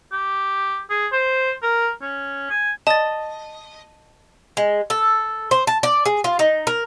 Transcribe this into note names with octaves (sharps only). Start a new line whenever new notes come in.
G4
G#4
C5
A#4
C#4
G#5
D#5 A5 A6
G#3
A4
C5
A5
D5
G#4
F4
D#4
A#4